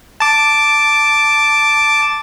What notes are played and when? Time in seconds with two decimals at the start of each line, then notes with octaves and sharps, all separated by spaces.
0.20 A5 D6